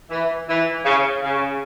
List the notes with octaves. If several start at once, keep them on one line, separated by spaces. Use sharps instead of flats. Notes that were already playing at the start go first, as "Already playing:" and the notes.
E3
E3
C#3
C#3